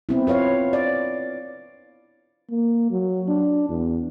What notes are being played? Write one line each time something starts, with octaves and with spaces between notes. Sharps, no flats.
B3 C4 E4
F4 B4 C#5 F5
D5
A#3
F#3
D4
E2